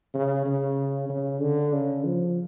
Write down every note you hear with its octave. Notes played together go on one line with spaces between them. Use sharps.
C#3
C#3
C#3
D3
C#3
F3